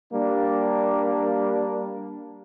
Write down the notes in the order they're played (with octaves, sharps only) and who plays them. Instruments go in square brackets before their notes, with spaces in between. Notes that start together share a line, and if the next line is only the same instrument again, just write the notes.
[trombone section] G3 A#3 D4